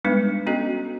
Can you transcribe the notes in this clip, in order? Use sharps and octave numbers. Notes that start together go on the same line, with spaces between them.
G3 G#3 B3 D4 D#4 B4
B3 C#4 F#4 A4 D#5